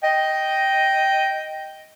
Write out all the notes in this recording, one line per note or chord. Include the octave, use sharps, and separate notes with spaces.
D#5 G5